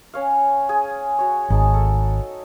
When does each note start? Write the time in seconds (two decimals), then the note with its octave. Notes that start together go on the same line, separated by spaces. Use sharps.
0.14 C#4 C#5 F5
0.69 G#4
1.18 F#4 C#5
1.50 G#1 D#4 G#4 A5
1.74 A4